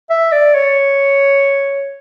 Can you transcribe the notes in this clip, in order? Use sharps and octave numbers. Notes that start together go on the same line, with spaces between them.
E5
D5
C#5